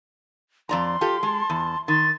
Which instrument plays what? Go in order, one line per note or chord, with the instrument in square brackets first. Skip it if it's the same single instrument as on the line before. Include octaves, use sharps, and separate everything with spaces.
[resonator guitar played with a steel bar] F2 D5 A#5 [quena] C6
[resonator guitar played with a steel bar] F4 G4 A4
[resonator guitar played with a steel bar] G#3 [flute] A5
[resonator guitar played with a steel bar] E2
[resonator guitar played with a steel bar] D#3 [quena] C6 [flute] A6